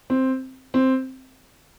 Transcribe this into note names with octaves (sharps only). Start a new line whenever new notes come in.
C4
C4